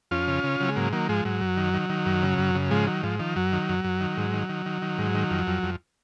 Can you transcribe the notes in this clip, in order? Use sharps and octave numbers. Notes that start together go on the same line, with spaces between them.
F2 C#4 F4
C#3
C#3
C#3 F#3
G#3
G#2 F#3 A#3
D#3 F#3 A#3
G#2 F3 G#3
G#2 F#3
F#2
D#3
D#3
D#3
F#2
C#3
F#2
C#3
G#2 F3 G#3
D#3 F#3
G#2 F3
D#3 F3
F#2 F#3
D#3
F#2
F#2
D#3
G#2
D#3
D#3
D#3
D#3
G#2
D#3
F2
F2
F2